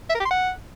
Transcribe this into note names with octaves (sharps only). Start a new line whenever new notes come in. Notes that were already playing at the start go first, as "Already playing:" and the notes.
E5
A#4
G4
C6
F#5